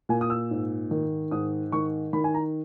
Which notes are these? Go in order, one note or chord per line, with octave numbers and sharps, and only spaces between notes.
A#2 G#5
D#6
E6
G#2
D#3
G#2 D#6
D#3 C#6
D#3 B5
G#5
A#5